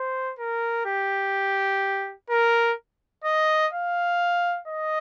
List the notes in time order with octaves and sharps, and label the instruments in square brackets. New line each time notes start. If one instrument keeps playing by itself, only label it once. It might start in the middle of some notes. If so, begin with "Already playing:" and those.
Already playing: [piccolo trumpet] C5
A#4
G4
A#4
D#5
F5
D#5